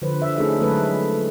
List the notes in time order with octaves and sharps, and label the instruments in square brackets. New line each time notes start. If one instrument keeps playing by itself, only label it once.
[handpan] D3 F3 B4 C5
E5
A3 C#4 D#4 G#4 A4 E5
D3 F#3 G#3 A3 A4 B4